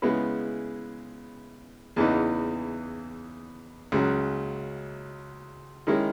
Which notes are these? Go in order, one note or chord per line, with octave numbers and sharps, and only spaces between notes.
C#3 G#3 B3 E4 B4
E2 C#3 E3 B3 D#4
C#2 C#3 F#3
D#3 G#3 C#4 E4